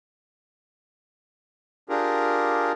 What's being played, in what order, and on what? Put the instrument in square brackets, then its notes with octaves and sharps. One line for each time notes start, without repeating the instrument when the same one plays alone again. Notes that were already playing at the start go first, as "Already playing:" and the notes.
[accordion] D4 F4 G4 G#4 A#4